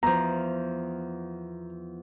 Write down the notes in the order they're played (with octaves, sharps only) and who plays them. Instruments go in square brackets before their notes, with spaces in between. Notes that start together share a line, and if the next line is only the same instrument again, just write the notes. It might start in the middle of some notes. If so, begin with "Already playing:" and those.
[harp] E2 F3 [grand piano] A#5